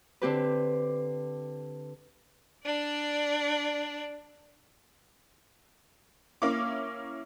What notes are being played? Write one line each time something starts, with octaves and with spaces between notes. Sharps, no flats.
D3 C4 G4 B4
D4 D5
A#3 C#4 E4 D6